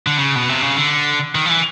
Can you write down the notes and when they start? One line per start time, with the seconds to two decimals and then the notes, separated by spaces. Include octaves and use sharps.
0.07 D3
0.17 C#3
0.35 B2
0.49 C3
0.62 C#3
0.76 D3
1.35 D#3
1.46 F3
1.50 E3